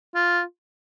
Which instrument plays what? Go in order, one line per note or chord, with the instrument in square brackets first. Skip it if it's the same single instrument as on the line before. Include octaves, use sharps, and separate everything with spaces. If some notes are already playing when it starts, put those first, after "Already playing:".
[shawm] F4